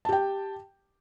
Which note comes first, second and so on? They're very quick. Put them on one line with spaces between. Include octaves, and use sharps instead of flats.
A5 G4 G5